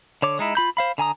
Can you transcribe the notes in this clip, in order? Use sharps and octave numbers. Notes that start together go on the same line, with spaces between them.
D3 C#5 D6
G#3 D#4 E4
F4 B5 G6
C5 F5 B5
D3 G#5 A#5 D#6